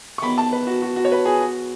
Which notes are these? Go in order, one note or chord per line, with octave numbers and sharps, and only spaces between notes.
C#6
E2 D#3 F#3 B5
A5
B4
F#4
F#4
F#4
C#5
B4
G#4
F#4